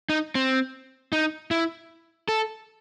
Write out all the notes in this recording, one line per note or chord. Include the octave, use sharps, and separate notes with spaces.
D#4
C4
D#4
E4
A4